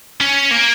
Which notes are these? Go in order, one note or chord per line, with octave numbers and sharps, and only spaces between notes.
C#4
A#3